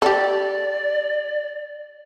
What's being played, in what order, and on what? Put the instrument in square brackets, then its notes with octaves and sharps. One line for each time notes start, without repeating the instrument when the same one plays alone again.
[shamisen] G4 A4 [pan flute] D5